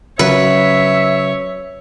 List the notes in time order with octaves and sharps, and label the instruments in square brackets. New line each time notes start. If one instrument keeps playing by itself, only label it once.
[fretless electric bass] C#3 F#3 [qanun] B4 [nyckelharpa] C#5 [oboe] E5